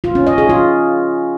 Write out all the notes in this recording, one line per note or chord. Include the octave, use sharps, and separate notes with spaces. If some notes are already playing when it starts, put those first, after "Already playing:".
F4
C#4
D#5
G#4
F4